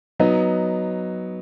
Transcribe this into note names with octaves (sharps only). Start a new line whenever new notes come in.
F#3 B3 D#4